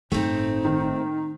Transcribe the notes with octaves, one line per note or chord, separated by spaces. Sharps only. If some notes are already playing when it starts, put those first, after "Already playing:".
G1 A2 A3 C4 D#4
D#3